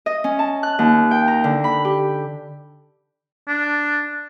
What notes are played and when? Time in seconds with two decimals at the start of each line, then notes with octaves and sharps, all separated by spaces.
0.06 D#5
0.24 C#4
0.39 A5
0.63 F#6
0.79 D#2
1.11 G5
1.28 A#5
1.44 D3
1.64 B5
1.85 G4
3.48 D4